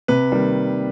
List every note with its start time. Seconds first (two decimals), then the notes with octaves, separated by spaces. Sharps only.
0.08 C3 B4
0.32 D#3 G3 A#3